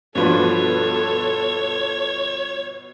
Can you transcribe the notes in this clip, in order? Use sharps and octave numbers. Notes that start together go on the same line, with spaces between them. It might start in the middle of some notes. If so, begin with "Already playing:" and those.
G2 B2 F3 A4 B4 C#5